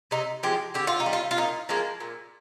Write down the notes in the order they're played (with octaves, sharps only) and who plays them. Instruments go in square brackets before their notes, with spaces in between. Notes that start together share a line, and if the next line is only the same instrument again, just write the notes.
[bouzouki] C3 D#4
F3 G#3 G4
D3 G4
F4
D#4
G3
F4
F4
A#2 D#4
F3 G#3 A#3
A#2